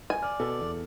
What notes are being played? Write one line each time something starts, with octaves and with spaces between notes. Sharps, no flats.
G#5
D5 F6
B2 A4
E2